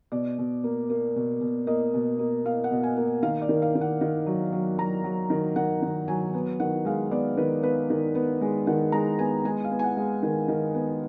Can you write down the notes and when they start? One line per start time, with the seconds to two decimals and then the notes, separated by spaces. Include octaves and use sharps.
0.12 B2 D5
0.38 B2
0.64 A#3
0.90 A#3
1.16 B2
1.41 B2
1.67 A#3 D#5
1.94 B2
2.19 A#3
2.45 A#3 F5
2.64 F#5
2.71 B2
2.83 G#5
2.97 A#3
3.22 D#3 F5
3.42 D5
3.49 D#3
3.62 F5
3.75 D#3
3.81 F#5
4.01 D#3
4.26 F#3
4.52 F#3
4.78 F#3 A#5
5.04 F#3
5.30 D#3
5.56 D#3 F#5
5.82 D#3
6.08 F#3 G#5
6.34 B3
6.60 D#3 F#5
6.85 G#3 F5
7.11 B3 D5
7.37 D#3 B4
7.63 B3 B4
7.90 D#3
8.15 B3
8.41 G#3
8.67 D#3 F#5
8.92 G#3 A#5
9.19 B3 G#5
9.45 G#3 G#5
9.64 F5
9.71 B3
9.79 G#5
9.84 F#5
9.97 G#3
10.23 D#3
10.48 D#3
10.74 B3